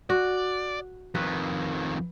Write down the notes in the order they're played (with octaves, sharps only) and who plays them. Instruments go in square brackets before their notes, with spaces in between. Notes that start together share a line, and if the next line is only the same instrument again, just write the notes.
[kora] F#4 [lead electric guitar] D5
[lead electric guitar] F2 D#3 [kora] B4